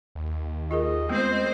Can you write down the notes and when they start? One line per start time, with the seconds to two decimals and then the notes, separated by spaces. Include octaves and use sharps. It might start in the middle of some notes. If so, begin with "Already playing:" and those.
0.15 D#2
0.71 F4 G#4 A#4 D#5
1.09 G#3 A3 B3 C4 C5